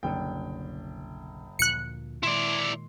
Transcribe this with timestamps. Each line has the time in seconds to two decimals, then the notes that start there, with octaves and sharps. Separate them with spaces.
0.03 F#1 B1 D3 G3 G5
1.59 D2 A#2 F3 F#6 C#7
2.23 A#2 D#3 G#3 E4 D5 C6